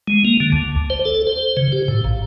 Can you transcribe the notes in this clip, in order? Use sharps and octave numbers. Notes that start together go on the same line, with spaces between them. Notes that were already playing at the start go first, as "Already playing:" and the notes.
G#3
A#3
D3
D2
C5
A4
C5
C#3
G4
A2
A#1